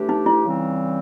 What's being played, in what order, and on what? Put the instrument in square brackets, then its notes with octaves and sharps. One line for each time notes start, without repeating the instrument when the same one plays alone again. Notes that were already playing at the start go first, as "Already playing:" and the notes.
Already playing: [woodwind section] A2 E3 A3 D4 G4
[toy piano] D#4
E4
[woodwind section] C#3 E3 G3 C4